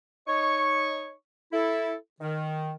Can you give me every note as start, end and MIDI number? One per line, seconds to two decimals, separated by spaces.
0.27 1.12 63
0.27 1.12 73
0.27 1.12 85
1.52 1.95 64
1.52 1.95 69
2.21 2.73 51